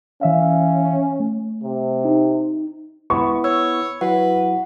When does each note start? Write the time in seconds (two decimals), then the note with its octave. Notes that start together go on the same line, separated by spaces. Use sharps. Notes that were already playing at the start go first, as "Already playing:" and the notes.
0.21 E3 C#4 E5 F5
1.20 A3
1.63 C3
2.05 D#4
3.10 B3 E4 B5 C#6
3.44 C#5 E6
4.01 F#3 E4 F#4 B4 F#5